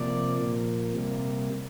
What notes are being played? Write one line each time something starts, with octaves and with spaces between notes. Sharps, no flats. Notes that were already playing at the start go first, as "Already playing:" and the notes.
Already playing: C3 F3 A#3 D5
A#2 F3 A#3
C3 G3 A#3